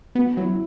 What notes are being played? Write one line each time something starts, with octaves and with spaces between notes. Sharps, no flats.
B3 F#4
F#3 E4